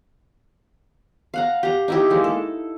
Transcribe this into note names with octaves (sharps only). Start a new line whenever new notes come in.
F5 F#5 A#5
G4 A#5
D#4 E4 G4
G#3 A#3
A4